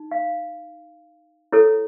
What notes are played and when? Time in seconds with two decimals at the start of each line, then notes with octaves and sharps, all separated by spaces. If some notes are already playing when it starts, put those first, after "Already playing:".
Already playing: D#4
0.11 F5
1.52 E4 A4 C#5